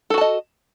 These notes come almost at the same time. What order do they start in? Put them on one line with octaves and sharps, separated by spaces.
A4 F#4 A5 D#5